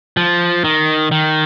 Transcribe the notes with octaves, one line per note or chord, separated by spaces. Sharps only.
F3
D#3
D#3